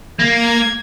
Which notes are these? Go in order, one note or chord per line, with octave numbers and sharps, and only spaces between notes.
A#3 G#6